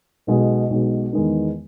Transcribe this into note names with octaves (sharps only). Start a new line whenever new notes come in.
B1 B2 G#3
B1 B2 G#3
E2 D#3 G#3 B3 D#4